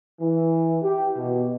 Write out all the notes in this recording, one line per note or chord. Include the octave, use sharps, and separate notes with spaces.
E3
G4
B2